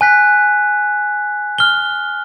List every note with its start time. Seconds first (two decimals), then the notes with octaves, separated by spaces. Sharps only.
0.01 G#5 F#6 B6
1.58 F6 G7